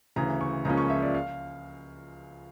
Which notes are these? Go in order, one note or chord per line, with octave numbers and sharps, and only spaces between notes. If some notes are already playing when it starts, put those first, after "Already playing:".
D2 C#3 E3 A#5
C#6
C#2 C#3 F3 A#3 C#4 A#5
C#6
E5
D5
F5